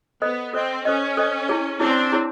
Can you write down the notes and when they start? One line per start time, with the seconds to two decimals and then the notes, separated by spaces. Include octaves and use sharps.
0.21 B3 A4 C5 D#5
0.53 C4 A4 C5 D#5
0.85 C#4 A4 C5 D#5
1.17 A4 C5 D#5
1.49 E4 G#4 C#5
1.79 C4 D4 E4 G#4 C#5
2.12 E4 G#4 C#5